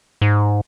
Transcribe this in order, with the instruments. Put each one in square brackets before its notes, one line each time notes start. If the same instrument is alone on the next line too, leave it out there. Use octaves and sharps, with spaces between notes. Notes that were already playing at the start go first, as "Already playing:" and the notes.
[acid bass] G#2